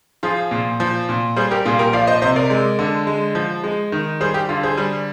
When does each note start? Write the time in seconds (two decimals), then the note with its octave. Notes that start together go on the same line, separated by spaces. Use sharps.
0.23 F3 F4 G#4
0.51 A#2
0.80 F3
1.09 A#2
1.36 G3 G#4 C5
1.51 G4 A#4
1.65 A#2 F4 G#4
1.79 G4 A#4
1.93 F3 D5 F5
2.07 C5 D#5
2.22 C3 C5 D#5
2.36 A#4 D5
2.50 G#3
2.79 D3
3.07 G#3
3.35 F3
3.64 G#3
3.92 D#3
4.20 G3 G#4 C5
4.34 G4
4.49 D3 F4
4.63 G#4 C5
4.77 G3